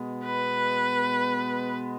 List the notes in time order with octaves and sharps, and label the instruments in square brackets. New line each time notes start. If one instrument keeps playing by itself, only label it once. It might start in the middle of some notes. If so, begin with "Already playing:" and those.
Already playing: [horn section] B2 G#3 B3
[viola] B4